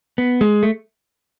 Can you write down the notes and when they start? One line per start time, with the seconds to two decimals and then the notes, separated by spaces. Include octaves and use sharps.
0.18 B3
0.41 G#3
0.63 A3